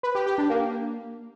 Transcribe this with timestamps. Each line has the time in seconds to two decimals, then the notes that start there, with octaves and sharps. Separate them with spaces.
0.03 B4
0.15 G4
0.26 G4
0.38 D4
0.50 A#3